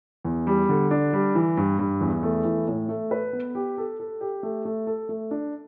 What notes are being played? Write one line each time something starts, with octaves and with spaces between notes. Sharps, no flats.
E2
G3
D3
D4
G3
E3
G2
G2
E2
A3
E3
A2
A3
B4
B3
G4
A4
A4
G4
A3
A3
A4
A3
D4